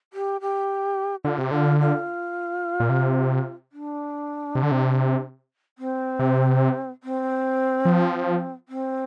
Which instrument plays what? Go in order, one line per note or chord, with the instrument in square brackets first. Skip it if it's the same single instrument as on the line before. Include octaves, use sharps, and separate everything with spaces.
[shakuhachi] G4
G4
[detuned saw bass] D3 [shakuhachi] F4
[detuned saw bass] C3 [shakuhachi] G4
[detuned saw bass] D3 [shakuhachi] F4
[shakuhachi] F4
[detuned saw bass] A#2
C3
[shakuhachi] D4
[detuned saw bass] C3
D3
C3
[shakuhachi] C4
[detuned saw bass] C3
[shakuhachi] C4
[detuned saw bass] F3
[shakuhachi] C4